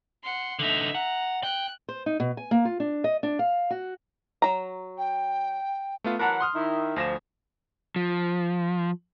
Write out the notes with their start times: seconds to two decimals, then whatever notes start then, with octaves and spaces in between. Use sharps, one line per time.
0.24 F#5 C6
0.59 D3 D#4 E5
0.95 F#5 A#5
1.43 G5 F#6
1.89 C5
2.06 D#4
2.20 B2
2.37 G#5
2.51 A#3
2.65 F4
2.80 D4
3.04 D#5
3.23 D4
3.39 F5
3.71 F#4
4.42 F#3 A#5
4.98 G5
6.04 A3 B3 F4
6.19 E3 F#3 A#4 F#5 A5 A#5
6.40 C6 D#6 F6
6.55 D#3 E4
6.96 D2 F3 A#6 E7
7.96 F3